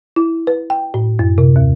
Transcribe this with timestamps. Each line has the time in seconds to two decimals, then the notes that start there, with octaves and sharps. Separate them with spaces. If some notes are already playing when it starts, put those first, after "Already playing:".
0.16 E4
0.47 B4
0.70 G5
0.94 A2
1.19 F#2
1.38 C3
1.56 D#2